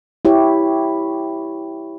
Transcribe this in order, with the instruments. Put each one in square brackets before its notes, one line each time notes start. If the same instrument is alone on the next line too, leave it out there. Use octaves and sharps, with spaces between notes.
[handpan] E4 G4 C#5